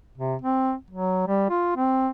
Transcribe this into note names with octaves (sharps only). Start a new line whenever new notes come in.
C3
C4
F#3
G3
F4
C4